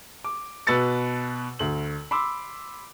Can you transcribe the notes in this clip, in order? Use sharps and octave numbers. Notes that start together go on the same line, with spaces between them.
D6
B2 B4 E6 A6 C#7
D2 F#7
B5 C6 D6 E6